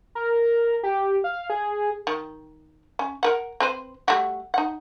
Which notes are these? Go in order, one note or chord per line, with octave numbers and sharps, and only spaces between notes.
A#4
G4
F5
G#4
D#3
C#4
A#4 B4 F#5
C4 B4 C5
G3 A3 F#4
D#4 F#5